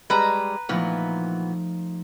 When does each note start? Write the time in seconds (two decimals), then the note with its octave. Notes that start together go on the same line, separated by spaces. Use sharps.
0.10 G3 G#3 B4 A#5
0.69 A#2 E3 F3 A3 B3 D#4